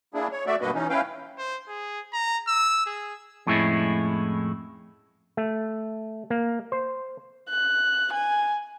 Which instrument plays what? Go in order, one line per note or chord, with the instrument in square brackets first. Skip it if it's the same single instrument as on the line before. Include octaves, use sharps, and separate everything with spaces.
[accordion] A#3 D4 E4 G#4
C#5
A3 F#4 D5 E5
G2 B2 A#3 F#4 B4 D#5
E3 C#4 D#4
C#4 E4 B4 F5 G5
[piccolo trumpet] C5
G#4
A#5
E6
G#4
[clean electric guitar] F2 A2 G#3 C#4 E4
[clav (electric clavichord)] A3
A#3
C5
[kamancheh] F#6
G#5